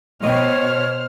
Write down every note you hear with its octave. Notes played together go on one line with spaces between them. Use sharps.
B2 C5 C#5 D#5 G5 F6